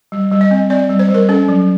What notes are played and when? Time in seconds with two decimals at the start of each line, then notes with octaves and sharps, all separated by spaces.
0.12 G3
0.31 G3
0.41 D#5
0.51 C4
0.70 C4 D5
0.89 G3
0.99 C5
1.09 G3
1.14 A#4
1.29 C#4 A4
1.49 F#3